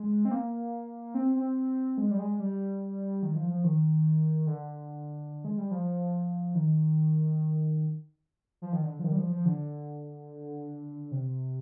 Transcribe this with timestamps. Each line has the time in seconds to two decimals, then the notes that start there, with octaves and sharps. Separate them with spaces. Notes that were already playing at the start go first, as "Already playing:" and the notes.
Already playing: G#3
0.25 C4
0.31 A#3
1.15 C4
1.35 C4
1.98 G#3
2.11 G3
2.19 G#3
2.40 G3
3.23 D#3
3.36 F3
3.50 F3
3.64 D#3
4.47 D3
5.45 G#3
5.58 G3
5.71 F3
6.55 D#3
8.62 F3
8.73 D#3
8.83 D3
8.99 F3
9.04 D#3
9.12 G3
9.18 F3
9.31 F3
9.45 D3
11.11 C3